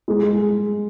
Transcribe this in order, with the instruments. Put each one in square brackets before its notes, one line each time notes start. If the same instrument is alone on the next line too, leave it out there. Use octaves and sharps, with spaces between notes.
[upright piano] G#3
G#3